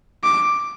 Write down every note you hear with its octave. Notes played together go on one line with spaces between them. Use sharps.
D6